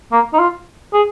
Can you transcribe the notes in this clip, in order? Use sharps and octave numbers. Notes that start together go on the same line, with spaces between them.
A#3
D#4
F4
G#4